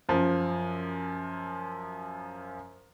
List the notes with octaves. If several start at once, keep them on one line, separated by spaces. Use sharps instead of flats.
F#2 F3